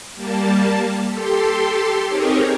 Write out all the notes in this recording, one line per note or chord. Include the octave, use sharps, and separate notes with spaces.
G3 A#3 A5
G4 A4 C6
C4 D#4 G4 G#4 A#4 C#5